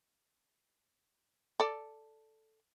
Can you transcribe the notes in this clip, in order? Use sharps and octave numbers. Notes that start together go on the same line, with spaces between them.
A4 D5